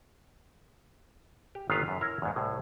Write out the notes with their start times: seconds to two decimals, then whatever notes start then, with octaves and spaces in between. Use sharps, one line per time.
1.55 G4
1.70 G1 A#2 D#3 F4 B4 F5
1.88 F#2
2.01 E4 A#4 C#5 E5
2.22 E2 G#2
2.36 C2 A2 G#4